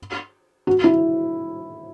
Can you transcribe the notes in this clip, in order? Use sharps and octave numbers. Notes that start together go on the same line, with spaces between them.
F#4
E4